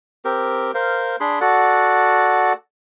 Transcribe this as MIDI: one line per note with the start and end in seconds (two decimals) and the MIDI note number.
0.25 0.72 60
0.25 0.72 67
0.25 0.72 70
0.74 1.16 70
0.74 1.16 72
0.74 1.16 77
1.20 1.39 62
1.20 1.39 68
1.20 1.39 83
1.20 1.39 84
1.41 2.53 66
1.41 2.53 69
1.41 2.53 74
1.41 2.53 78